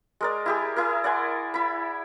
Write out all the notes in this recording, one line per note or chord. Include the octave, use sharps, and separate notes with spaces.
G#3 A#4 D5
E4 G4 G#4
E4 G#4 A#4
D5 F#5 G#5 C6
E4 B5